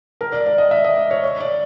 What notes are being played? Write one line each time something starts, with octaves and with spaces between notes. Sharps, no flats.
A#4
D5
D5
D#5
E5
D#5
D5
C#5
C#5
D5